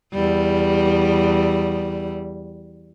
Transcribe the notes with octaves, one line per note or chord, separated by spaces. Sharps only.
E2 G3